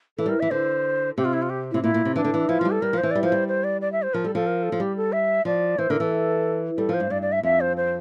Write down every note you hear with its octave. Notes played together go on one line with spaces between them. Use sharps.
E3 A4
G3
A#4
E3 E5
D3 C5
C3 G4
F4
E4
F4
G4
E4
C3
A#2 E4
A#2
C3
E3 D4
D3
E3
F3 E4
F3 F4
G3
A4
G3 A#4
F3 C5
E3
G3 D5
F3 C5
G3
C5
D5
D5
E5
C5
F3 A#4
G3 A4
F3 A4
A#4
A4
F3
G3 G4
A4
E5
F3 D5
E3 C5
D3 A#4
E3 A4
G3 A4
F3 C5
G2
G2 D5
D5
E5
F2 E5
C5
C5